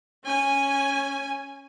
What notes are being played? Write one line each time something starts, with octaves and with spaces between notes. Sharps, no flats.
C#4 G#5